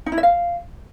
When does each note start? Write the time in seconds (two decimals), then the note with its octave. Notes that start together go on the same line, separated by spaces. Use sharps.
0.06 D#4
0.12 E4
0.18 E5
0.23 F5